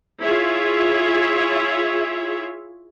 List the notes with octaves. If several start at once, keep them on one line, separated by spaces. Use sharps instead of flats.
E4 F4 G#4 C#5 E5